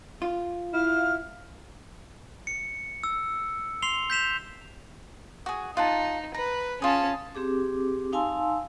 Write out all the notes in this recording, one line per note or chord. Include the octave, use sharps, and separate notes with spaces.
F4
E4 F5 F6
C#7
E6
C6 C7 F7 G7
G6 B6 E7 F7
F#4 G#4
D#4 F4 F#5 A5
B4 A#5
C#4 F4 G#4 A5
C4 G4 G#4 D6
D#4 F5 G#5 A5 C6 E6